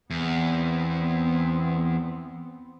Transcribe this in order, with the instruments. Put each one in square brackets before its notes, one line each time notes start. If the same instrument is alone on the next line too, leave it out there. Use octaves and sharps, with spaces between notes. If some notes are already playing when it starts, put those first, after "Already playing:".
[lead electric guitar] E2 [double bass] B3 C4